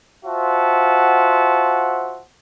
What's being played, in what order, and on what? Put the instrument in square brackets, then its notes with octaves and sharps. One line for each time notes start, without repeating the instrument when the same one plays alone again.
[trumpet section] F4 F#4 C5 E5 F#5 A5